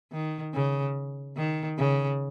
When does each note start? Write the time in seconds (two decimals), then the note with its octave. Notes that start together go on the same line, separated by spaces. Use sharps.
0.12 D#3
0.54 C#3
1.37 D#3
1.78 C#3